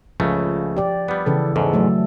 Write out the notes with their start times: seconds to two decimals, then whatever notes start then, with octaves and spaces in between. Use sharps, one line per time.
0.20 C#2 C#3 F3 A3
0.77 G4 D5
1.08 G3 B3
1.26 C#3 E3 A4
1.56 E2 G#2 A4
1.73 F#3 A3